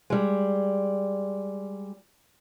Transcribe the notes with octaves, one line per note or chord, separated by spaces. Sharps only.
G3 G#3